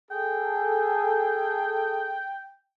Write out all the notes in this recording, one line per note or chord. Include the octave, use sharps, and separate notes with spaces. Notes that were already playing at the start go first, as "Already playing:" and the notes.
G#4 A4 G5